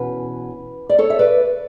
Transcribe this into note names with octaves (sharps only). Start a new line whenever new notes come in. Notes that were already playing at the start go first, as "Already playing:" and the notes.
Already playing: E2 B2 C#4 B4
D5
A4 C#5
E5
B4 D5